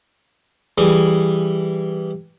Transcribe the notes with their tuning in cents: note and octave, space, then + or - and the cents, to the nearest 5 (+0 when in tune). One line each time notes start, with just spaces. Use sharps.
E3 +0 G3 +0 G#4 +0